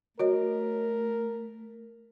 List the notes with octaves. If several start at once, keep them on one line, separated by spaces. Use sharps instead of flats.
A3 F#4 A#4 C#5 D#5